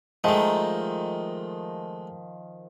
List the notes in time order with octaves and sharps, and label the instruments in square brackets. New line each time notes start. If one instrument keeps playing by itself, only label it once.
[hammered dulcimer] D#3 F3 [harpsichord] G#3 A3